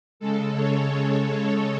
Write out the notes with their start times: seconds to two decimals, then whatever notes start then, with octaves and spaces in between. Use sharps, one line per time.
0.20 C#3 G#3 A4
0.54 C#5